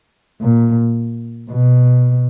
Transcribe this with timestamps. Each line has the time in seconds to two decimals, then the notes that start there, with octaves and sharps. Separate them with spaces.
0.41 A#2
1.50 B2